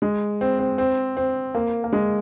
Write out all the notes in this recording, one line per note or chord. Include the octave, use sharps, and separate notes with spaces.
G#3
C4
C4
C4
C4
A#3
A#3
G#3